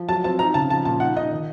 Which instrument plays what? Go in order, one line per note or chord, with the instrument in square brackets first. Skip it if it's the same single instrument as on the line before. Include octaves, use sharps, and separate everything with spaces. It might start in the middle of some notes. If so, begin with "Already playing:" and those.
Already playing: [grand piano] F3
[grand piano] F#3 [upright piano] A5
[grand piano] C4 [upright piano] A5
[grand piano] D#4 [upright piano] A#5
[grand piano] C#3 [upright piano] A5
[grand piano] F3 [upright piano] A5
[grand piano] A#2 [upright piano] A5
[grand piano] D#4 [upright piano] F#5
[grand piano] D#4 [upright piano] D#5
[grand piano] D#3